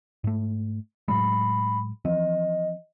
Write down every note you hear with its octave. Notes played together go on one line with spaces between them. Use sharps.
G#2 A3
A2 F#3 G#3 B5
E3 F3 C4 D#5